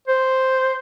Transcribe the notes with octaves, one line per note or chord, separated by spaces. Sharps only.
C5